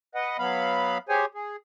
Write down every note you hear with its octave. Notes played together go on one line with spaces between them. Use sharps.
B4 D#5 F#5
F#3 B3 F5 B5
G4 G#4 C5 C#5 G#5
G#4